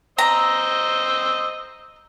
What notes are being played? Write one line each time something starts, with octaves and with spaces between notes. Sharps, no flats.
C5 D#5 A#5 E6